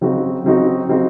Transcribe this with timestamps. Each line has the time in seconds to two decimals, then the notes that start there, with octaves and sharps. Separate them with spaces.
0.01 C#3 F#3 C4 D#4 F#4
0.44 C#3 F#3 C4 D#4 F#4
0.88 C#3 F#3 C4 D#4 F#4